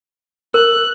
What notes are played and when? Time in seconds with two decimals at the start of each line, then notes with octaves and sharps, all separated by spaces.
0.54 A#4 F#6